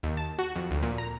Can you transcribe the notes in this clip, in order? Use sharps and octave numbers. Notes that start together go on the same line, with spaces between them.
D#2
A5
F#4
F2
D2
A#2
A#5